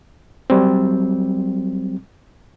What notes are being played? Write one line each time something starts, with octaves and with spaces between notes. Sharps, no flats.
F#3 G3 C4